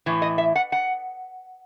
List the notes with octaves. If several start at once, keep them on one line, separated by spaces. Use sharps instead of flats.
A2 E3
D#5
E5
F#5
F#5